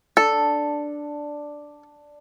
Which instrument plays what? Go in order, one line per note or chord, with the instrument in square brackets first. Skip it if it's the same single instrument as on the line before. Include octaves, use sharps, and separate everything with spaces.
[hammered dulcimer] D4 [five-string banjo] A4